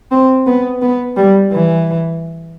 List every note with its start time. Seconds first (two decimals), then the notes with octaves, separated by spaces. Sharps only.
0.11 C4
0.46 B3
0.82 B3
1.17 G3
1.53 E3